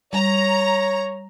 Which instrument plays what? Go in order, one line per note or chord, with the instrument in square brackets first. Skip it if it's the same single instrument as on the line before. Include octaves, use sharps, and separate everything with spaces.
[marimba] G3 [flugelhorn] C#5 [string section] A#5